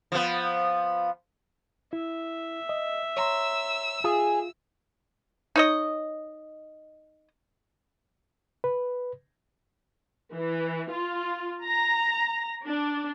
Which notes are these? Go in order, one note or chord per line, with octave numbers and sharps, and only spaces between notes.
F3 B3
E4 E5
D#5
C#5 A#5 C6 E6
F4 G#4
D#4 C#5 D#5
B4
E3
F4
A#5
D4